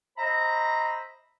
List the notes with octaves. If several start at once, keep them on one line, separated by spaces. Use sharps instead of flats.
C5 D#5 E5 A#5 B5